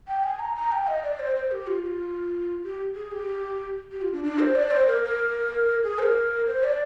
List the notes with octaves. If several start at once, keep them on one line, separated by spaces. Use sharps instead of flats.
G5
G#5
A#5
A#5
G5
D#5
D5
C5
C5
G4
F4
G4
F4
G4
G#4
G4
G4
F4
D4
D4
C5
D5
C5
A#4
A#4
G#4
C5
A#4
C5
D5